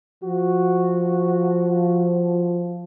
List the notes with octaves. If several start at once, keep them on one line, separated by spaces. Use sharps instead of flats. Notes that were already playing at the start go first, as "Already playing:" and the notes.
F3 F#4